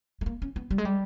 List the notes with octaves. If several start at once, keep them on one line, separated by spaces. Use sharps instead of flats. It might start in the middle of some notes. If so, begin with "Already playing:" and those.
A3
A#3
C#4
B3
G3
G#3
G3